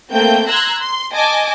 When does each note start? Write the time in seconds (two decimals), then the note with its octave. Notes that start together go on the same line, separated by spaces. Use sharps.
0.10 A3 A#3 C4 G5 G6
0.48 A#5 C6 E6 F#6 G#6
0.79 C6
1.13 D#5 G#5 A5 D6